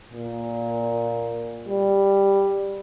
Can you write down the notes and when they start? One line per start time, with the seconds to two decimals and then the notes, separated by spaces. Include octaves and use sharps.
0.12 A#2
1.68 G3